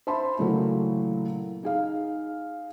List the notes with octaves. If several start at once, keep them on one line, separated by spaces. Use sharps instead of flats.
C5 E5 A5 B5 C6
A#2 C#3 E3 F#3 A3 A#3
D#4 G#4 F5